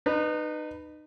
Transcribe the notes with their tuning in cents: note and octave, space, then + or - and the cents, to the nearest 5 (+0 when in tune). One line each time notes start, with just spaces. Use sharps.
D#4 -30 B4 +0